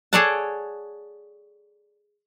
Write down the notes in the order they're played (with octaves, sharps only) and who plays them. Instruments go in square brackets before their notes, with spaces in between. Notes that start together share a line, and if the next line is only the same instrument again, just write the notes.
[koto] G#4 A4 C#5 D5 F#5 A5